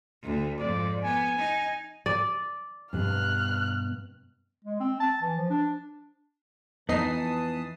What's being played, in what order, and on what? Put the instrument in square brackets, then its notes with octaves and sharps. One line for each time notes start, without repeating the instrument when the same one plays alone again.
[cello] D2
[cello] F2 G#2 [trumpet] D5
[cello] B3 [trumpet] G#5
[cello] D#4
[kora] D5
[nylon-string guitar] G2 B2 [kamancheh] F6 F#6
[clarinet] G#3
C4
A5
E3
F3
D4
[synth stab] F2 D#4 C7 [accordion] E3 A5 D#6 [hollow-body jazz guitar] B3 [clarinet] B4